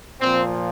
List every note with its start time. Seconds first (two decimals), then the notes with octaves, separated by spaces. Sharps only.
0.21 A#2 F3 C4